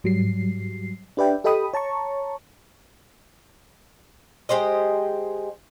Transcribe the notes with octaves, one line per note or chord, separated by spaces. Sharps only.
G#2 F#3 G3 C7
D4 G4 B4 D5 E5 G5
G4 A4 D#5 G5 B5 D#6
C#5 A5 A#5 C#6
G#3 G4 C5 D#5